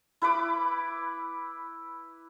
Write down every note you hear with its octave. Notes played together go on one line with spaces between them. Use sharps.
E4 B4 B5 D6